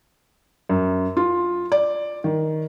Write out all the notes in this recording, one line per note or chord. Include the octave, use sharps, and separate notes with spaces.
F#2
F4
D5
D#3